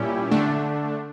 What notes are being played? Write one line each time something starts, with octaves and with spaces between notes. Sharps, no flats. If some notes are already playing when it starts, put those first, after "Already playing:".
Already playing: A#2 G3 C#4 E4 G4
D3 A3 D4